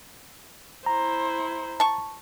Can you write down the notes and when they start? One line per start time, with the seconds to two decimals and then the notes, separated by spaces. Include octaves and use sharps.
0.86 E4 C5 A#5
1.80 A5 C#6